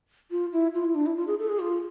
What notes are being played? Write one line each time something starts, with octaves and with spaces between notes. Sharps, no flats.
F4
E4
F4
E4
D4
E4
F4
G#4
A4
G#4
F4